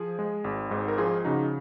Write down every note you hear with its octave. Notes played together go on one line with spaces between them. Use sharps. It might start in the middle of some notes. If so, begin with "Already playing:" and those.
Already playing: F3 G#4
G#3
G#1
G#2
A#4
F3 F4 G#4
C#3 D#4 F#4